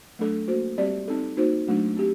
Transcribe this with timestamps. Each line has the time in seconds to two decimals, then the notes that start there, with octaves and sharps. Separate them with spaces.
0.19 F#3 A3 D4 A4
0.48 A#3 F#4 C5
0.78 G3 C4 G4 D5
1.08 C4 D#4 A4
1.37 A#3 D#4 F#4 C5
1.67 F#3 A3 D4 F#4
1.97 C4 G4